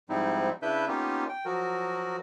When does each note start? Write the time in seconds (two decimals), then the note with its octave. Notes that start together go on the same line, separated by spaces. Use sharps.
0.09 G#2 F3 G3 C4 D#4 E4
0.62 C#3 D4 E4 B4 E5 G6
0.88 A#3 B3 C#4 D#4 F4 G4
1.29 G5
1.45 F3 F#3 F#4 A#4